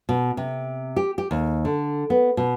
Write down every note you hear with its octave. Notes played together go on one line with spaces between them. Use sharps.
B2
C3
G4
G4
D#2
D3
B3
B2